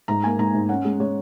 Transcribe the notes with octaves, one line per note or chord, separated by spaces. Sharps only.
G#2 A#5
A#3 G#5
G#2 A#5
G#2
C#4 F#5
G#3
G#3 C#5